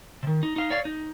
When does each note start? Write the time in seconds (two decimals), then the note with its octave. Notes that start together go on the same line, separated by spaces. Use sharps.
0.23 C3 D#3
0.43 D#4
0.56 D#4 F5
0.70 C#5 D5 F5
0.85 D#4